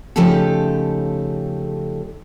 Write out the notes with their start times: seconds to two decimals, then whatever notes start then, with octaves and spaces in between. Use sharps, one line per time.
0.16 C#3 F3 A3 D#4 G4 A4